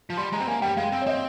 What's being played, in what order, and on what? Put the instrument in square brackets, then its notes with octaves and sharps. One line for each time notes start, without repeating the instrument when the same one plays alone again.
[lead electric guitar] F3
[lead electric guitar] G3 [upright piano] C6
[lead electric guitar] G#3 [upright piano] A#5
[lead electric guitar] C4
[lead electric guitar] A#3 [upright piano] G#5
[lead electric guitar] G3 [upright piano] G5
[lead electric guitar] G#3 [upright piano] F5
[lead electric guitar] C4
[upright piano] C#5
[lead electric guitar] C4 [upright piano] D#5